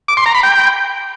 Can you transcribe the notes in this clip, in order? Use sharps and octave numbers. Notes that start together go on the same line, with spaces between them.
D6
C6
A#5
B5
G5